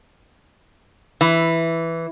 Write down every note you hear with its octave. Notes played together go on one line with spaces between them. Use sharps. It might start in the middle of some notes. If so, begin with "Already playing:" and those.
E3